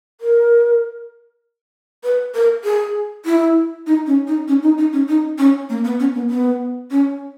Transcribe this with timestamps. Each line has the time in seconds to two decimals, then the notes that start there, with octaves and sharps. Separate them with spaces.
0.21 A#4
2.04 B4
2.35 A#4
2.64 G#4
3.25 E4
3.87 D#4
4.07 C#4
4.27 D#4
4.48 C#4
4.63 D#4
4.78 D#4
4.93 C#4
5.08 D#4
5.38 C#4
5.69 A#3
5.84 B3
6.00 C#4
6.15 B3
6.30 B3
6.91 C#4